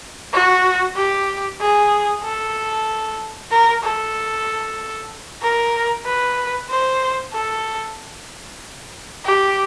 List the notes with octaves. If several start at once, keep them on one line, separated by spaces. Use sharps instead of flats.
F#4
G4
G#4
A4
A#4
A4
A#4
B4
C5
A4
G4